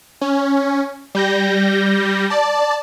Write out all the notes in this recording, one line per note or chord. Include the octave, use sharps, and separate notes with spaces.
C#4
G3 G6 A#6
D5 A5